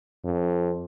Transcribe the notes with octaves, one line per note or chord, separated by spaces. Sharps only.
F2